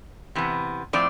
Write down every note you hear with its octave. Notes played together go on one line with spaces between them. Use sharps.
C3 E3 B3
A2 F3 C4 D5